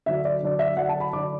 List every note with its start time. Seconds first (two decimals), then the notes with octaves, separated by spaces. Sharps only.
0.06 D3 F#3 D4 E5
0.25 D5
0.43 D3 F#3 D4
0.59 E5
0.77 D3 F#3 D4 F#5
0.89 A5
1.00 B5
1.13 D3 F#3 D4 D6